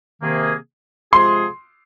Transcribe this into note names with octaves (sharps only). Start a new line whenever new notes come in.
C3 D#3 A#3 G#4
C3 F3 G#3 F4 G#4 C6